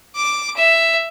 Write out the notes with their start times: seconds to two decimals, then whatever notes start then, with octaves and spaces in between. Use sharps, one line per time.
0.15 D6
0.57 E5